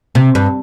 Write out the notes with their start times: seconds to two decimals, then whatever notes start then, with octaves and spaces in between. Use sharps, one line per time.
0.15 C3
0.35 G2